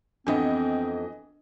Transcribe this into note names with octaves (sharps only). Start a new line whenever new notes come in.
F2 E3 B3 C4 D4 D#5